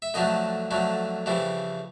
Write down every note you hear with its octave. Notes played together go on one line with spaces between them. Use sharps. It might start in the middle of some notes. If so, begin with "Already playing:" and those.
E5
F2 D3 F#3 A3 D#5
F2 D3 F#3 A3
F2 C#3 E3 G3 C4